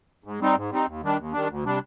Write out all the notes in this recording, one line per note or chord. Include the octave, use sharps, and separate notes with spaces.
G#2
G3 C4 D#4
G#2
G3 C4 D#4
D#2
D#3 G3 D4
D#2
D#3 G3 D4
D2
C3 G3 D4